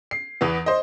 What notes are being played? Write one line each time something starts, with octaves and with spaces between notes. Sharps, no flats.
C7
E2 E3 B3
C5 D#5